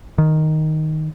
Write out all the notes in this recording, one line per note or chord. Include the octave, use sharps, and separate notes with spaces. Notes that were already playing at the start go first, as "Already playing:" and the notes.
D#3